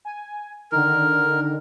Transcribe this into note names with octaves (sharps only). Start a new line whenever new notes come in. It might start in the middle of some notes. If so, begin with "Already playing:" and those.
G#5
D3 D#3 A#4